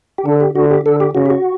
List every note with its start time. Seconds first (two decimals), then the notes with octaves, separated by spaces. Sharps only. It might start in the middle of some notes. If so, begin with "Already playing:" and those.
0.18 G4
0.25 D3 A4
0.40 G4
0.55 D3 F#4
0.71 G4
0.86 D3 A4
1.00 G4
1.15 C#3 F#4
1.26 G4
1.30 F#4